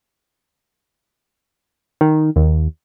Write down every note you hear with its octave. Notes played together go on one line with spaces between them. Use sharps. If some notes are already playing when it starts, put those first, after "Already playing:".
D#3
D#2